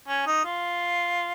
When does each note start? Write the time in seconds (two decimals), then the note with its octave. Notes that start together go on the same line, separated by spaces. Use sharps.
0.08 C#4
0.27 D#4
0.45 F4